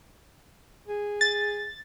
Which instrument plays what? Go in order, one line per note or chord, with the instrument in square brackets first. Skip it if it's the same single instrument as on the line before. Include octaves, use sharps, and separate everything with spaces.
[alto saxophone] G#4
[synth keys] A6